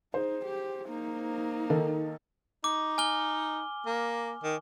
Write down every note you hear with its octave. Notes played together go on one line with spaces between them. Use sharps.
D#4 G#4 C5
G4
A#3 D#4
D#3 A4 A#4
D#4 D6
G#5 F6 G7
A#3
D#3